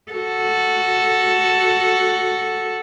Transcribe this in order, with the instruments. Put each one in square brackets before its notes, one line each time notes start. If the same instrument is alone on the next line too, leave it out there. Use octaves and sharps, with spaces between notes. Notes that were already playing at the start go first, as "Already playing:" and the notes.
[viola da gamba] F#4 A4